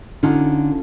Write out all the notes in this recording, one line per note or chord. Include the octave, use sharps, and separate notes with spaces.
D3 C#4 D#4 F4